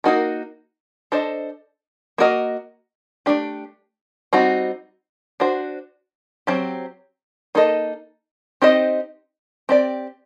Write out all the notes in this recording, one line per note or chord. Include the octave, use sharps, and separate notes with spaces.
A#3 D#4 F#4 A#4
D4 A4 C5 D#5
A#3 F#4 A#4 D#5
A3 D4 G4
G3 C4 D#4 F#4
D4 F#4 C5
F#3 C4 G4
A#3 D#4 A4 C5 D#5
C4 D#4 G4 C5 D#5
C4 G4 D5